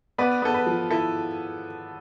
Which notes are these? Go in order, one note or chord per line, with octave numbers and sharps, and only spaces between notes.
B3 B4 D5
B3 A4
B4
F3
E4 A4